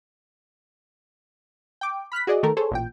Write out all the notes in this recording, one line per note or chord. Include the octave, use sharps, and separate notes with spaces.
G5 D6
B5 F6 F#6 B6
F#4 G#4 D5 D#5
D#3 A3 A4 A#4
G#4 A4 C5 C#5
A1 A#2 G5